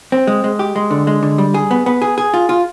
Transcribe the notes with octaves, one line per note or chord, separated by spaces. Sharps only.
C4
G#3
G#3
G4
G#3
D3
G#3
D3
G3
G#4
B3
B3
G#4
G#4
F4
F4